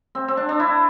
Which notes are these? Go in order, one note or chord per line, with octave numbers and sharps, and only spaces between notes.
C4
C4
D4
D4
E4